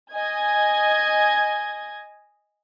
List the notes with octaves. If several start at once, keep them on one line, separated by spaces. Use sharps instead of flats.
D#5 G#5 G#6